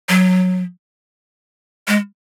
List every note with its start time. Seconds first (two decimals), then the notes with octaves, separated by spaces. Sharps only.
0.09 F#3
1.88 G#3